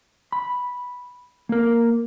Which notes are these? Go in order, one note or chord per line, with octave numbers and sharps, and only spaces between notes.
B5
A#3 A#4